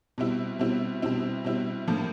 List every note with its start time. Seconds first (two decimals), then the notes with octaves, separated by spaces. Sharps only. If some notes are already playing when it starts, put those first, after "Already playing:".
0.18 B2 G3 C4 E4
0.59 B2 G3 C4 E4
1.02 B2 G3 C4 E4
1.44 B2 G3 C4 E4
1.88 A2 F3 A#3 D4